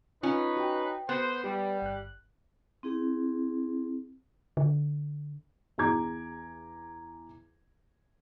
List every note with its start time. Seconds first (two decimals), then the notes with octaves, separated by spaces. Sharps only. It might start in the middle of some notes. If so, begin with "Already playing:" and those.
0.23 C#4 D#4 F4 B4
0.57 F#4 G5
1.09 B3 C5
1.44 G3 G4
1.82 G1 F#6
2.83 C4 E4 G#4
4.57 D3
5.78 E2 G#4 A#5 D6 G#6